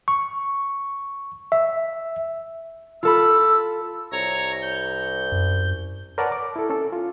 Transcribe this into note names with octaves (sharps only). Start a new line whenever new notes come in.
C#6
E5
F4 A4 B5 E6
C2 C#5 A#5
G6
F#2
A#4 B4 C#5 D5 F#5 A5
D6
E4 A4
C#4 A4
F4